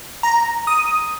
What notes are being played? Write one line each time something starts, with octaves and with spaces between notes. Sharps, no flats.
A#5
D#6